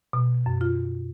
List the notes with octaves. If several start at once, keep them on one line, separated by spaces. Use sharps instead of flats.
B2
F#2
F4